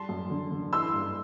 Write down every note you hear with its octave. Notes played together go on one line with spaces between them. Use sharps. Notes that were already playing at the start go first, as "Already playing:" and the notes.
Already playing: G3 A5 C6
F#2
D3
D3
E3 C6 E6
G2